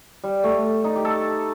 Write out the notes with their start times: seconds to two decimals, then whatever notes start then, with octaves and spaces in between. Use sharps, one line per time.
0.24 G3
0.44 A3
0.84 D#4
0.96 G4
1.05 A4